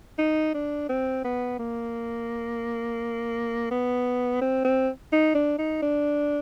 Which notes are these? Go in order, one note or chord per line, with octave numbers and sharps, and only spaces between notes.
D#4
D4
C4
B3
A#3
B3
C4
C4
D#4
D4
D#4
D4